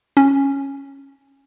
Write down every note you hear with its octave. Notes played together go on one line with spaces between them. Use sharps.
C#4